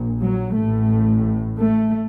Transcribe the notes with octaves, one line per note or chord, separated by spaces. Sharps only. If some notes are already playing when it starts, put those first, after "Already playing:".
Already playing: A#1 A#2
F#3
A1 A2 A3
A3